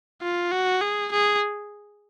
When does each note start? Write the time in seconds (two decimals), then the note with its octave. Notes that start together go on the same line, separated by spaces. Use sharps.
0.22 F4
0.51 F#4
0.81 G#4
1.12 G#4